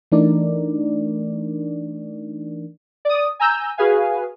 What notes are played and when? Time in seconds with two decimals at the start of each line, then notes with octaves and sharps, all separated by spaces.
0.12 E3 A3 D4 D#4 A#4 D5
3.05 D5 D#6
3.40 G#5 A#5 E6 G6
3.78 F#4 G#4 B4 F5 G#5